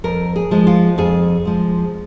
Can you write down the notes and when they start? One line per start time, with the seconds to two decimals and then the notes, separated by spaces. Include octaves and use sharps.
0.04 F2 A#4
0.36 G#4
0.51 F3 G#3
0.67 F4
0.98 F2 G#4
1.45 F3 G#3